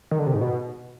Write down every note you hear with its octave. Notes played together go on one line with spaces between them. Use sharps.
D#3
D3
C3
G#2
B2